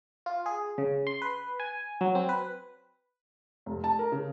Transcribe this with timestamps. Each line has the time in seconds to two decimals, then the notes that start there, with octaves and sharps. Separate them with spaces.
0.26 F4
0.46 G#4
0.78 C#3
1.07 C6
1.22 B4
1.60 G#5
2.01 F#3
2.15 C4
2.29 B4
3.66 F1
3.84 A5
3.99 A#4
4.12 C#3